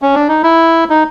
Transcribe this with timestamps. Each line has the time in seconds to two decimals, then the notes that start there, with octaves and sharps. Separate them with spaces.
0.02 C#4
0.15 D4
0.28 D#4
0.43 E4
0.90 D#4